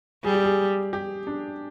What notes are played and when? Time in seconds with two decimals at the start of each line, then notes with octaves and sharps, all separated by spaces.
0.24 G3 G#4
0.34 G4
0.44 G#4
0.93 G4
1.27 D4